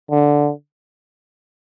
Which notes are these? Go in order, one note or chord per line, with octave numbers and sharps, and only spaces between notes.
D3